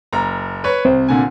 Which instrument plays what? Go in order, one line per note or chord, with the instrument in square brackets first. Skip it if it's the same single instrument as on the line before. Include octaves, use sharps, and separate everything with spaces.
[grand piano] F#1 A#5
B4 C#5
[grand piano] C2 [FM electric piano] C4
[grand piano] A#2 D3 G#5